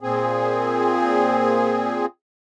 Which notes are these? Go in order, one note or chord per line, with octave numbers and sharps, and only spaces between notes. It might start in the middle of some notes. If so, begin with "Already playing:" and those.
A#2 C4 G#4